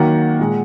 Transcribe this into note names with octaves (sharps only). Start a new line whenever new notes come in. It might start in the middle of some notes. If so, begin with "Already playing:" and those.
Already playing: D#3 F#3 A#3 F#5
A#2 G#3